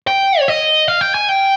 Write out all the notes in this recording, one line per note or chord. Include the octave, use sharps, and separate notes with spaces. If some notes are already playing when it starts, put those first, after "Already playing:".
G5
C#5
D#5
F5
G5
G#5
G5